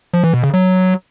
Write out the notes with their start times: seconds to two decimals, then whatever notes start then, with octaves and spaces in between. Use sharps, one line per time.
0.14 F3
0.24 E3
0.34 B2
0.44 C#3
0.54 F#3